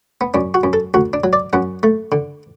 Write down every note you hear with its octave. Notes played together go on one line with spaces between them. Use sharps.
B3
F#2 D4
F#4
F#2
A4
D2 F#4
D4
F#3
D5
F#2 F#5
A3
D3